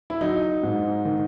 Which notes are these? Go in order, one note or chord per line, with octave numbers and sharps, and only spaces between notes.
E4
F#3 D#4
G#2
D#3